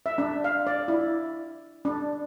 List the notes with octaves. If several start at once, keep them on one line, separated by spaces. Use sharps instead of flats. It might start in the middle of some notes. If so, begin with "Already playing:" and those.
E5
D4
F5
D5
E4
D4